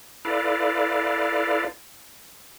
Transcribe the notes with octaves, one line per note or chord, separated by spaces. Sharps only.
E4 A4 B4 D5 F5